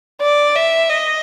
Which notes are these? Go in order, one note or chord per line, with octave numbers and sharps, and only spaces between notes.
D5
E5
D#5